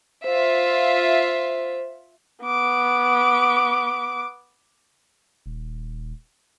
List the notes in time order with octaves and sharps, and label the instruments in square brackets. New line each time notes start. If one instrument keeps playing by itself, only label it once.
[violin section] F4 E5 [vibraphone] C5
[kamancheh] B3 D6
[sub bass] D#1